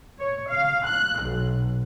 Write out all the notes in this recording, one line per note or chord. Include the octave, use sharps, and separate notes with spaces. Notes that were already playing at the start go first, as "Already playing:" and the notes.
C#5
F5
F#6
B1